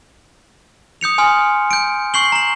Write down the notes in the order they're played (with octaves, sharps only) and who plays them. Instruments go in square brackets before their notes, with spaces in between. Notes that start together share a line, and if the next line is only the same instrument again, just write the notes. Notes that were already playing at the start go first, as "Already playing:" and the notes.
[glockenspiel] D#6 G6 C#7 F7
G#5 C6 D#6 F6
G6 D7
C#6 G6 C7 F#7 G7
A#5 F#7